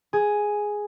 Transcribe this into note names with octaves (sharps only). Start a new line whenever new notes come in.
G#4